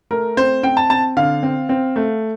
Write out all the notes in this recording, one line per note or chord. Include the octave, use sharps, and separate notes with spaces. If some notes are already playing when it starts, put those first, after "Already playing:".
A3 A#4
C4 C5
C4 G5
A5
C4 A5
D3 F5
C4
C4
A3